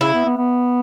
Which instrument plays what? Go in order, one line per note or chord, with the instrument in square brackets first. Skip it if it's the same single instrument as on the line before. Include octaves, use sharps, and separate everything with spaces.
[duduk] C#3 [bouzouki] E4
[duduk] B3
B3
B3